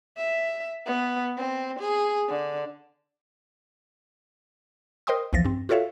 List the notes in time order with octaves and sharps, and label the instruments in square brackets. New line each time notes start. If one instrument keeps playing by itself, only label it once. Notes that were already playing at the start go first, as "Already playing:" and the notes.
[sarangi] E5
B3
C4
G#4
D3
[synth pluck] A#4 C5 D#5 G5 C6 D#6
B1 E2 E3 F3 A6 A#6
G2 C4
F4 F#4 A4 C#5 E5 F5